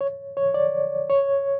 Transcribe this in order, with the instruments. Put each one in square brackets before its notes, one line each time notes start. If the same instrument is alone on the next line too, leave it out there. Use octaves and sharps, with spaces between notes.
[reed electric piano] C#5
C#5
D5
C#5